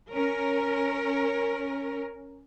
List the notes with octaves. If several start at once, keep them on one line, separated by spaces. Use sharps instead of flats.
C#4 A#4